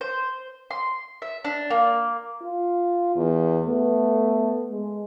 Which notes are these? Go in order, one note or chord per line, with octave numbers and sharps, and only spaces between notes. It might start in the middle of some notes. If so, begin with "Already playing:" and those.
C5
C6
E5
D4
A#3
F4
E2
A3 B3
G#3